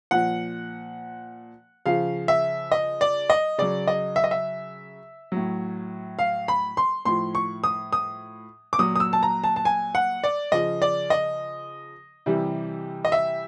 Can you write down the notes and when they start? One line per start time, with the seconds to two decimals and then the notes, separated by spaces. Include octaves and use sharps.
0.11 A#2 F3 F#5
1.86 C#3 F3 F5
2.28 E5
2.72 D#5
3.01 D5
3.30 D#5
3.58 C#3 F#3 D5
3.87 D#5
4.16 E5
4.24 D#5
4.31 E5
5.32 A2 F#3
6.19 F5
6.48 B5
6.77 C6
7.05 A2 F3 C6
7.35 C#6
7.64 D#6
7.93 D#6
8.73 D6
8.79 A#2 F#3 D#6
8.96 D#6
9.00 E6
9.13 A5
9.23 A#5
9.44 A5
9.56 A5
9.65 G#5
9.95 F#5
10.24 D5
10.52 C#3 F3 D#5
10.82 D5
11.10 D#5
12.26 C3 E3 G3
13.05 D#5
13.12 E5